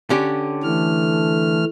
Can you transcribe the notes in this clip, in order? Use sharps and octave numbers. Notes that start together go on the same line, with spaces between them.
D3 C#4 G4
E3 A3 F6